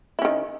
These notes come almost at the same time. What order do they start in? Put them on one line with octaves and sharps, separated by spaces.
E4 C#4 D#3